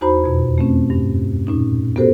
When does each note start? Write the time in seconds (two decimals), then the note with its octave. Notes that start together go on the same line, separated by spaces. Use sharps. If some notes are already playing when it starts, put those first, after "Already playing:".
0.01 E2 D#4 F#4 C5 A#5 B5
0.24 F2 B2
0.58 A3 C4 C#4
0.90 G2
1.47 A#2 C#4 D#4
1.96 B3 F#4 G4 A4 A#4 C5